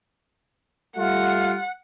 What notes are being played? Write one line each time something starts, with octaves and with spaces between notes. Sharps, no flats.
G3 A3 F4 F#5